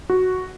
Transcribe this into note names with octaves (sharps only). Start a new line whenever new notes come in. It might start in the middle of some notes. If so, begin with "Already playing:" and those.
F#4